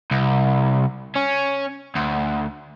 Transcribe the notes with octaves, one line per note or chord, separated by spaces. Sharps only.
C2
C#4
D2